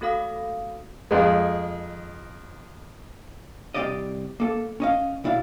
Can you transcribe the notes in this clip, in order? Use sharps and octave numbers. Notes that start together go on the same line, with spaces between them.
A3 F#4 A4 F5 D#6
F2 G#3
C2 G2 C4 G4 D5 D#5
A#3 A4
C#4 D#5 F5
B2 E4 D5 F5